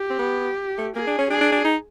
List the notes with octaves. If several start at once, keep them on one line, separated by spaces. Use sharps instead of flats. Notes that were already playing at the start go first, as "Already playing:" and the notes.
Already playing: G4
C4
B3
A3
A#3 G#4
D4
C#4
D4 G#4
D4
D4
D#4